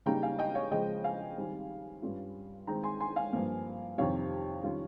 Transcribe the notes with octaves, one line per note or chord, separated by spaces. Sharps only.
C#3 G3 A#3 D#4 G5 A#5
F5 G#5
D#5 G5
C#5 F5
C#3 F3 G#3 D#5 G5
F5 G#5
D#3 G3 C4
G2 G3 C#4 F4
D#3 G#3 C4 G5 A#5
G#5 C6
G#5 C6
F5 G#5
G2 F3 A#3
F2 C3 D#3 G3 C#5 F5
D#3 G3 C#4 F4